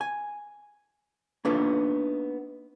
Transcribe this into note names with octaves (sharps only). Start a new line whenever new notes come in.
G#5
A#3 B3 D4 D#4 F4 B4